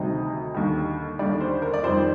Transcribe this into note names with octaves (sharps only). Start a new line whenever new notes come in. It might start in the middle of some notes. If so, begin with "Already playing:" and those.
Already playing: D2 C3 D#3 G3 D#5
D#2 D3 G3
D#2 D3 G3 D5
C5
A#4
D5
F2 D#3 G3 C5